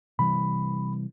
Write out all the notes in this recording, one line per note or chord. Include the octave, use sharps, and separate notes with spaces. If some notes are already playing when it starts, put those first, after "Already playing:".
C3 E3 G3 B5